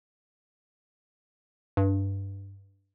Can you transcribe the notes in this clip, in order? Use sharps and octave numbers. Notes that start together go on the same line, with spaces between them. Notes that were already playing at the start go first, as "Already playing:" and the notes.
G2